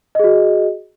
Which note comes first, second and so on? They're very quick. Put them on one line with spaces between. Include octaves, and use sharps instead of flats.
D#5 G#4 F#4